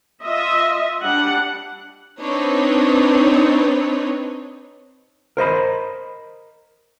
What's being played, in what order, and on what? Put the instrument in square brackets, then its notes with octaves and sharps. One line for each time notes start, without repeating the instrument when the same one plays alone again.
[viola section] F4 D#5 E5
G3 D4 F#5
[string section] C4 D4 D#4 B4 C#5
[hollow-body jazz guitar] A#4 C5 D#5 B5